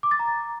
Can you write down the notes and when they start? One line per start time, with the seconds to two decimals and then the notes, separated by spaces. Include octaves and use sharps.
0.03 D6
0.11 A6
0.19 A#5